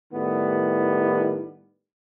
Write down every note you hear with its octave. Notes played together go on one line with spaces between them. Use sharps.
A2 D#3 G3 B3